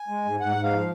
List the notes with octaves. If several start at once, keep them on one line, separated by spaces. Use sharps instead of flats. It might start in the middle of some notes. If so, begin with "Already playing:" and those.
Already playing: G#5
G#3
G#2
G#2 F#5
G#2
F5
F3